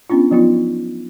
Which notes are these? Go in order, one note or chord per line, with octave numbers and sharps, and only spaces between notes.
B3 C#4 D4 F4
F3 F#3 B3 D#4 F4